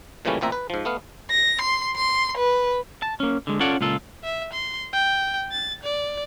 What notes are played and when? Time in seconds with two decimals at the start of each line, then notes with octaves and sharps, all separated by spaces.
0.25 A#2 C#3 E3 G3 A3 C#4
0.41 A1 A#2 C4 E5 A#5
0.52 B4
0.70 G#2 F3
0.85 A3 B3 F5
1.31 A#6
1.61 C6
1.96 C6
2.37 B4
3.02 A5
3.20 A#3 C#4
3.47 D3 G#3
3.60 C#4 F4 A4 C#5 D5 F#5
3.81 C#2 A#2 F4 A4
4.24 E5
4.53 C6
4.93 G5
5.52 A6
5.83 D5